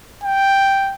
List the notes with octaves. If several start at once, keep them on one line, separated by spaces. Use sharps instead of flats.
G5